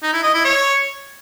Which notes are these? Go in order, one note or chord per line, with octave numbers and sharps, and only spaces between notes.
D#4
E4
D#5
E4
C#5